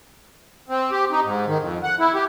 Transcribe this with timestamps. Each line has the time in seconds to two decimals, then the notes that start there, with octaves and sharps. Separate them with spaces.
0.69 C4
0.91 G4
1.11 D#4
1.24 G#2
1.47 D#3
1.60 F2
1.84 F#5
1.99 E4
2.14 G4